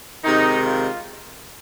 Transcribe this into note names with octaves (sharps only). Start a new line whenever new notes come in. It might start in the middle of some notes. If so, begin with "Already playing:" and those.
C3 D#3 G#3 D#4
F4